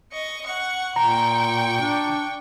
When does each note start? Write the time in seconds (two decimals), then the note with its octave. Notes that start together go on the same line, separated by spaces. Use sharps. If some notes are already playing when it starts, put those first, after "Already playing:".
0.12 D#5 C#6
0.46 F#5 C#6
0.96 A#2 G5 A#5 C#6
1.81 D4